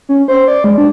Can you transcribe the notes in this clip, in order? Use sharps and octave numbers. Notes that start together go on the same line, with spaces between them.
C#4
C5
D5
G#3
D4